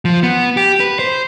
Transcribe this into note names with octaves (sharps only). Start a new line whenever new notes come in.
F3
B3
G4
B4
C5